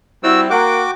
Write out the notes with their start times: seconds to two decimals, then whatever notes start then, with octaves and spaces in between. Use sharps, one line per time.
0.23 G3 C4 E4 F#4 E6
0.50 A#3 F#4 F#5 G5 D6